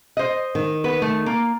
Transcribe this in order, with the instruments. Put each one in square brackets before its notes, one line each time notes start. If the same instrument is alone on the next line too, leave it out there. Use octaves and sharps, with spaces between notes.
[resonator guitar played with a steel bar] C5 D#5
[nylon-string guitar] D#3
[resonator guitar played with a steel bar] B3 B4
A3
A#3